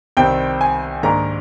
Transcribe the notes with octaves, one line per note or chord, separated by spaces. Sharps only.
C2 C3 D#3 G3 C4 G5
G#5
G#2 D#3 A#3 D4 A#5